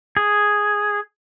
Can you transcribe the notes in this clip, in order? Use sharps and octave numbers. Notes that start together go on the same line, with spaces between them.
G#4